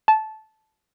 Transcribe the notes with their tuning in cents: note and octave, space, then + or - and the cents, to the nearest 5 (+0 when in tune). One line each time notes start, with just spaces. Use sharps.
A5 -15